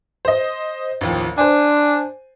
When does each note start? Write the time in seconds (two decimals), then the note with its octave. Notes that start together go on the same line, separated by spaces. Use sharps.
0.25 C5 D#5
1.01 A1 D#2 F3
1.38 D4 C5 G#5